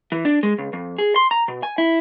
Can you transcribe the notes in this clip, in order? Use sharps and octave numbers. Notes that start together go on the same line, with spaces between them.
E3
D4
G#3
C#2
F2
G#4
C6
A#5
B2
G#5
E4